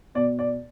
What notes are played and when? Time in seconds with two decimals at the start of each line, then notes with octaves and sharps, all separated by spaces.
0.15 B2 D5
0.39 D5